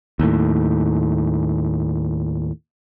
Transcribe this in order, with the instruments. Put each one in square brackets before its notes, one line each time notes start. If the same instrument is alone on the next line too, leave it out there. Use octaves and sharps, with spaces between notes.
[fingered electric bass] D#2 A2